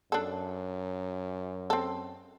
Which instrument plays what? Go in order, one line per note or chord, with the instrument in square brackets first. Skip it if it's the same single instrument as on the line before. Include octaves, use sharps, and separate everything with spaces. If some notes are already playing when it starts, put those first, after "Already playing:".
[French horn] F#2 [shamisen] D4 A4
[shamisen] C4 A4